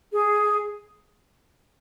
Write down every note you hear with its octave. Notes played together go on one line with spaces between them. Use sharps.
G#4